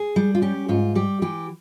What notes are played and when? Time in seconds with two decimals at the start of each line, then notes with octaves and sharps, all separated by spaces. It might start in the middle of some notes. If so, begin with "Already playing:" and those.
Already playing: G#4
0.16 G3
0.35 F4
0.42 C#4 G4
0.69 G#2 F4
0.95 G3 G4
1.22 E3 G4